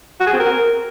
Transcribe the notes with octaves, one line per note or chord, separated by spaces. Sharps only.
F#4
G#4
C4
A#4